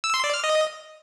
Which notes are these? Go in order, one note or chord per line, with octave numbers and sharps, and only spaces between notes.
E6
C6
D5
F6
D#5